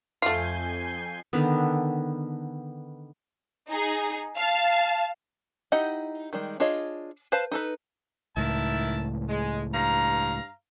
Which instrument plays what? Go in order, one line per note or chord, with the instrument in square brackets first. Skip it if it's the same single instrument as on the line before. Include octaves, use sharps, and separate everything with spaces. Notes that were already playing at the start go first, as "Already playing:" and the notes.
[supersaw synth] F2 G#5 G6 [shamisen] A3 F4 [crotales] C7
[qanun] D3 D#3 B3
[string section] D#4 G#4
F5 A5
[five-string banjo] D#4 E4 G4 D#5 F#5
D#3 G3 G#3
D4 F4 G#4 C#5 D#5
B4 C5 F5 A5
D#4 A4 B4
[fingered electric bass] C#2 A2 [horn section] D#3 E4 A5
[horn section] G#3
G2 F5 A#5